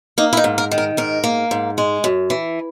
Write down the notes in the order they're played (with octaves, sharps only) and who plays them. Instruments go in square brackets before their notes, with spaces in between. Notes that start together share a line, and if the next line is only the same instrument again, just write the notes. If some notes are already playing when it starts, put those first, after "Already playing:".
[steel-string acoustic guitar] A#3 D#4
E4
D#4
G#2
A#4
D#3
A#4
G#2 A#4
A#3
G#2
G#3
F#2
E3